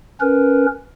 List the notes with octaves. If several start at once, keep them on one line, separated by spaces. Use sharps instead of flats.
C#4 A#4 B4